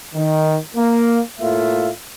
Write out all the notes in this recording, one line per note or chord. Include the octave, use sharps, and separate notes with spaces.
D#3
A#3
A2 A3 A#3 F4 E5